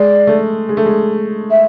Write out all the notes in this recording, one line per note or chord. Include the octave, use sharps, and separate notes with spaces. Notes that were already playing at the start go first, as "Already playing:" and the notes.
Already playing: G#3 D5
A3
G#3
A3
G#3
E5